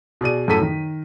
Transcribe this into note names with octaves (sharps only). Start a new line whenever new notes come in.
B2 G#4 D5 D#7
F#2 A2 F#4 A4 B6 D#7
D#3